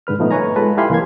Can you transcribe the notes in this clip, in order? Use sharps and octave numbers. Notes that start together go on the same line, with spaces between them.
G#2 D3 B4 F6
A#2 F3 A3 B3 D#4
B4 C#5 G#5 A#5
G#3 F4 A4 B4 A5
E4 G4 F5 G#5 B5 C6
C2 E3 A#3 C6 G#6